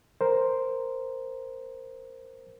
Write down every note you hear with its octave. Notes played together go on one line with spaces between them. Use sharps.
A#4 C5